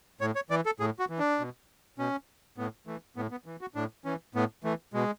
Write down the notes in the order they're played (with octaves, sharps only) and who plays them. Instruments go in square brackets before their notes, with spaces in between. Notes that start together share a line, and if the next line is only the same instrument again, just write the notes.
[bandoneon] A2 C#5
C#5
E3 D5
A4
A2 G#4
F#4
E3
D4
B2
B2 C#4
A2 B3
E3 A3
A2 B3
B3
E3
F#4
A2 D4
E3 C#4
A2 B3
E3 A3
B2 G#3